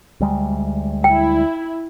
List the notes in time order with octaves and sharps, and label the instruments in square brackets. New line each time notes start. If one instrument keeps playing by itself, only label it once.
[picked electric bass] D2 G3 G#3
[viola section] E4 [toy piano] G5